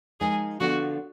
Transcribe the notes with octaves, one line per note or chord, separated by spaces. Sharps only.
F3 G#3 D#4 G#4 A#4 D#5
D3 F3 B3 D4 F#4